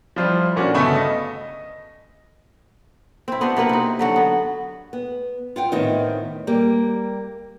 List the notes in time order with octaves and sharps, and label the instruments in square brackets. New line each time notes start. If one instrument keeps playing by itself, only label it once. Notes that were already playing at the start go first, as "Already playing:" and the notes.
[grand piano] F3 G3 E4 F4 C5
A#2 C#4 D4 F#4
G1 C#3 A3 B3 E5 C#6
D#5
[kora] C4 E4
B3 D4 F#4 C5
C3 A#3 B4 F#5
C4 D#4
D3 F#3 F#4
B3
[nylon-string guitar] B3
F4 F#5 G5
A2 D#3 B3 C4 D#4
G3 A#3 G4